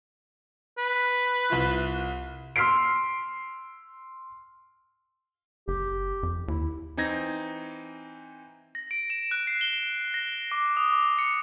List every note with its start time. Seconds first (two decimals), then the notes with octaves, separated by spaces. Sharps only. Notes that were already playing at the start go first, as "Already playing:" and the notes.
0.78 B4
1.50 C2 E4 F4
2.56 C6 E6 F6 B6 C7 D7
5.68 F#1 G4
6.23 F2
6.48 D#2 E4
6.97 E3 C4 D#4 G#6 A#6
8.75 A#6
8.91 D7
9.10 E7
9.31 F#6
9.47 C7
9.61 G7
10.14 A#6
10.52 D6
10.77 D#6
10.93 D6
11.19 C#7